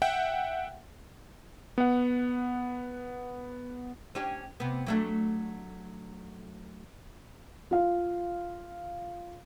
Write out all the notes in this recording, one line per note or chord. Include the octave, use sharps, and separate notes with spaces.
E5 F#5 G5
B3 F#5
C#4 D4 G4
C3 B3
F#3 A3 D4
F4 F5